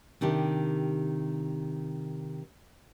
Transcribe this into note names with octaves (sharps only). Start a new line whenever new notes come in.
C3 D#3 D4 G4